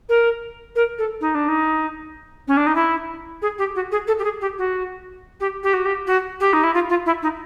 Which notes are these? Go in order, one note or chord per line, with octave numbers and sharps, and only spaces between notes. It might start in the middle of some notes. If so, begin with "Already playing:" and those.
A#4
A#4
A4
D#4
D4
D#4
C#4
D4
D#4
E4
G#4
G4
F#4
G#4
A4
G4
G#4
G4
F#4
G4
G4
F#4
G4
F#4
G4
D#4
E4
F4
F4
E4
D#4